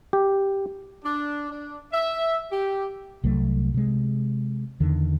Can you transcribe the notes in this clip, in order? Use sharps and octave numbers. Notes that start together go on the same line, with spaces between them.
G4
D4
D4
E5
G4
C2 F#3 A3
C3 G#3
E2 D3 D#3